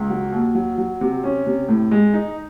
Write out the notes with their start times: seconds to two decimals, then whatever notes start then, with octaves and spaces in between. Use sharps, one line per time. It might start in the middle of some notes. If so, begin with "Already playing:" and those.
Already playing: C#2
0.10 F#3
0.32 D#2
0.55 F#3
0.78 F#3
1.01 C3
1.24 C#4
1.46 C3
1.68 A2
1.91 G#3
2.14 D#4